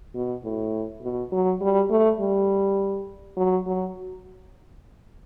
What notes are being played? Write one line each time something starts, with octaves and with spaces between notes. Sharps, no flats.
B2
A2
B2
F#3
G3
A3
G3
F#3
F#3